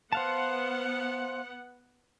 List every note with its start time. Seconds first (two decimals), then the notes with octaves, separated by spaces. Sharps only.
0.12 B3 C5 F5 F#5 A5